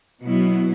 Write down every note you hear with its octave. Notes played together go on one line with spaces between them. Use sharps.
B2 F#3 B3 E4